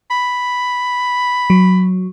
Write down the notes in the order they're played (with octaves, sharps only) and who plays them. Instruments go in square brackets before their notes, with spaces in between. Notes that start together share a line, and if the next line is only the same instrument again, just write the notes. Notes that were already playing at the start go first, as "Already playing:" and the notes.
[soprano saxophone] B5
[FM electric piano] F#3